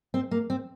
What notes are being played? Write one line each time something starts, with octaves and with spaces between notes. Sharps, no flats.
C4
A#3
C4